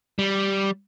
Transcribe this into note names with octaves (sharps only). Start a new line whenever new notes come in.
G3